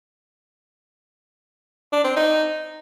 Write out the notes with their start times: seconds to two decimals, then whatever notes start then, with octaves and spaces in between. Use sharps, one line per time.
1.92 D4
2.04 C4
2.16 D#4